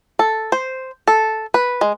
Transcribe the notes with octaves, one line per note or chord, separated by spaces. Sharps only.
A4
C5
A4
B4
G#3